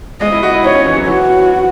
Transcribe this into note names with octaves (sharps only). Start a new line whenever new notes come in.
G#3 D#5
E4
F#4
E4
D#4 C#5
C#4
E3
F#3
E3 F#4